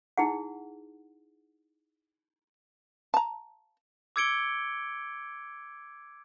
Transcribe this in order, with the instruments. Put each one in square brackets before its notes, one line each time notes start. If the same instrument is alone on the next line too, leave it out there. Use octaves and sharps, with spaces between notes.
[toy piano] D#4 E4 G#4 F#5
[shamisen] A5 A#5
[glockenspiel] D6 E6 G#6 C#7 D7 G7